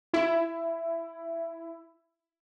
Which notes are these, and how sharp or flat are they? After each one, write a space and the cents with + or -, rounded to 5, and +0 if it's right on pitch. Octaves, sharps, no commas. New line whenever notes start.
E4 +15